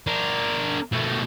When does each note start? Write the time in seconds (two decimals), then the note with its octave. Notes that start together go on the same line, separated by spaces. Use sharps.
0.07 D4 A#4
0.92 B2 A3